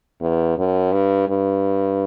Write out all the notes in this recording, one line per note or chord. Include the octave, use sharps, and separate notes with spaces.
E2
F#2
G2
G2